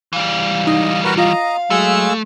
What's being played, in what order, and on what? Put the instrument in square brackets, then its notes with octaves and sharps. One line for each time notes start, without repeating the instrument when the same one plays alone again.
[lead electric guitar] E3 G3 [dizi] F5
[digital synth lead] D#4 [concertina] D#5
[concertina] F#4 A#4 B4 [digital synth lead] C#7
[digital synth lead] F4 [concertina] D#5 A#5 [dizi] F5
[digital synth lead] F#3 [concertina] G#3 E6 [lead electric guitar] A3